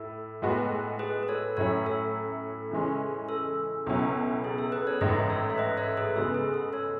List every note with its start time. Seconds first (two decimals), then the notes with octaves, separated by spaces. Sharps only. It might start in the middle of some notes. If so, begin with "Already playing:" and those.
Already playing: A2 E4 A4
0.42 A2 G#3 B3 F#4
0.99 G#4 B4
1.23 B4
1.28 A4 C#5
1.56 A2 F#3 A3 C#4 E4 A4 C#5
1.86 A4
2.71 C#3 E3 G#3 C#4
3.29 A4
3.86 C#2 B2 F#3 C#4 E4
4.44 G#4
4.58 A4
4.72 G#4 B4
4.87 A4 C#5
5.01 A1 G#2 D#3 A3 B4 D#5
5.30 A4 C#5
5.50 E5
5.58 B4 D#5
5.77 C#5 E5
5.88 A4
5.97 G#4 B4
6.16 C#3 G#3 B3 F#4 A4
6.34 G#4
6.54 A4
6.73 A4 C#5